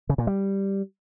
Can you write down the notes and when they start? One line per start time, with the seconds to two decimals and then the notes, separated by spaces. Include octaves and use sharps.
0.09 C#3
0.18 A#2
0.27 G3